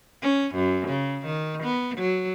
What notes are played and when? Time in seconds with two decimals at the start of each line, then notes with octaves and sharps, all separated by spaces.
0.22 C#4
0.55 F#2
0.88 C#3
1.26 D#3
1.64 B3
1.98 F#3